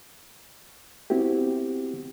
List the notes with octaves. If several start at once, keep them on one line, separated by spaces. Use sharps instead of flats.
B3 C4 E4 F#4 G4